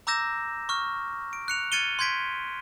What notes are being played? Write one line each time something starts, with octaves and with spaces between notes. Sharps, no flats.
A#5 D6 E6 G6 A#6 E7
C#6 F6
D7
F#6 C#7 F7
F6 G#6 A6 C#7 D#7 G7
C6 G6 G#6 B6 D7